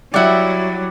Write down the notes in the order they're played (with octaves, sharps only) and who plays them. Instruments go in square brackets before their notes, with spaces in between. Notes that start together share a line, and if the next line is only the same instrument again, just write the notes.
[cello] F#3 [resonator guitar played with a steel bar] G3 E4 [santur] D5 F#5